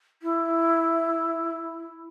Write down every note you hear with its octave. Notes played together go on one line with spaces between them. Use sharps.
E4